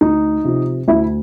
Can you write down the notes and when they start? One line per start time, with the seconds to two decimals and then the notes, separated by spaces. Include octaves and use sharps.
0.01 D2 D#4
0.44 C3 F3
0.88 D2 E4